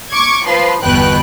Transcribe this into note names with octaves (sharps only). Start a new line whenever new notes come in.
C#6 D6 G#6
F3 B4 C6
G1 E2 B2 B4 G5 F#6